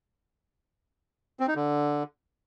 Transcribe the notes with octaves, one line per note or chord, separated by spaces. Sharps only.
C4
D#4
D3